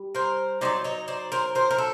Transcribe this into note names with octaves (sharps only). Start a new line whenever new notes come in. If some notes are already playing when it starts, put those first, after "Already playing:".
Already playing: G3
A#4 C5
F#3 B3 D#4 C5 D5
C#5 D#5
C5 D5
A#4 C5
A#4 C5
A#4
A4